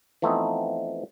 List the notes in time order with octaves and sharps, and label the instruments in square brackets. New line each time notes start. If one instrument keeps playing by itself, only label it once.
[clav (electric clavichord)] E3 F3 A3 B3 C4 D#4